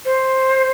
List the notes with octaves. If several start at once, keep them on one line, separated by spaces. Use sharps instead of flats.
C5